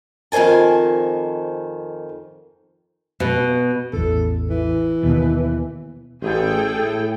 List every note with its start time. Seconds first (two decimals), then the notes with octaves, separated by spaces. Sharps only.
0.32 F2 D#3 C5 G#5 A5
3.20 B2
3.93 A1 E2 A4
4.50 E3
5.03 D#2 B2
6.22 A1 G#4 A4 G5
6.74 A2